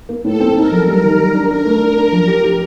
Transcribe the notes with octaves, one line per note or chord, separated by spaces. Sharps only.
A#3
A2 A4
C4
D#4 A#4
F3
G3 A#4
D#3
G3
D4
D4 A#4
A3
D4
D4
F3
G4
G4